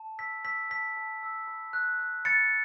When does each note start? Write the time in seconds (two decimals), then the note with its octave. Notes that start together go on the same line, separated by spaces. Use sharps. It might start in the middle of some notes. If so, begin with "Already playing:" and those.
Already playing: A5
0.19 E6 B6
0.45 E6 B6
0.70 A5 B6
0.97 A5
1.23 E6
1.47 B5
1.73 F#6
2.00 F#6
2.25 B5 A6 C#7